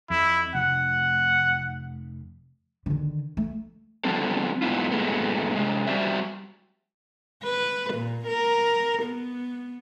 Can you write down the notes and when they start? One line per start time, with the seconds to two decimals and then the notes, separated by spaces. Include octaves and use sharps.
0.10 F2 E4
0.55 F1 F#5
2.86 D3 D#3
3.37 A3
4.04 D3 F3 G3 B3 C4 A4
4.62 G#2 B3 E4 F4
4.91 G2 A#2 G#3 A3 B3
5.56 C3 G#3
5.87 G3 C4 F#4 C5 D5 E5
7.44 B4
7.94 A#2
8.27 A#4
9.03 B3